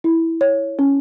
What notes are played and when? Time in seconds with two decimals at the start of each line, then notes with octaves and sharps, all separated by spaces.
0.04 E4
0.41 C#5
0.79 C#4